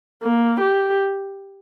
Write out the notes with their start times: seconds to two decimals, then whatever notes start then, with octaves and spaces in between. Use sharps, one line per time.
0.23 A#3
0.60 G4